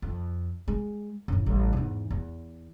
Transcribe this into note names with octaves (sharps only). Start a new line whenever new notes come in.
F2
G#3
F#2 A2
A1 G3
E2 G#2
E2